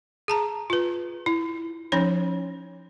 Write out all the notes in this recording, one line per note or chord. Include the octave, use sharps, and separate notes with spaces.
G#4 A5 A#5
F4 B4
E4
F3 C#4 D#4 C#5